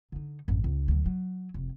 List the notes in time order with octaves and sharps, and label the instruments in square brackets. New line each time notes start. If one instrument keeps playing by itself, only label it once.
[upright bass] D3 D#4
A1 F#2
C#2
D2 F#3
F#3
F1